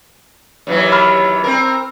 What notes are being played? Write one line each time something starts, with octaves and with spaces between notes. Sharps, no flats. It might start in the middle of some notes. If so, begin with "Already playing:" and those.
D#2 E3 F#3
B5 F6
C4 A#4